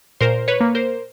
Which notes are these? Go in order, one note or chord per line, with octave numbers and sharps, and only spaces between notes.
A#2 A#4 C5
B4 C#5
A#3
A#4 C5